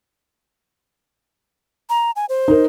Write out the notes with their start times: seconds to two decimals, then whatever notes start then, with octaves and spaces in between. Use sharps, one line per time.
1.89 A#5
2.16 G#5
2.29 C5
2.48 D#4 A#4